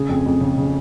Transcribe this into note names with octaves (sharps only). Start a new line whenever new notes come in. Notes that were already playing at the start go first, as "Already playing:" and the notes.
Already playing: C#3 G#4
F2
F2
C#3
C#3